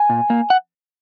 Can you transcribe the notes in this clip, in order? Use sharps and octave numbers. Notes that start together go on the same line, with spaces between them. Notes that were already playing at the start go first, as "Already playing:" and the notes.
Already playing: G#5
A#2
A#3
F#5